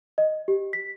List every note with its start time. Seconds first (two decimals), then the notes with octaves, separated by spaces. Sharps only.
0.18 D#5
0.48 G4
0.73 B6